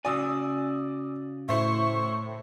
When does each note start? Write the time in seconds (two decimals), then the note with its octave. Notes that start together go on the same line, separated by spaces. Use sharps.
0.05 C#3 F#4 D5 G#5 D#6 E6
1.49 A2 E4 C5 E5 C#6